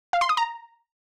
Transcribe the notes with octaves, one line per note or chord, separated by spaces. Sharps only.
F5
C6
D#6
A#5